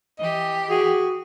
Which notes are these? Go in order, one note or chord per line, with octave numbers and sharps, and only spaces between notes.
E3 G4 D#5
F#4 G#4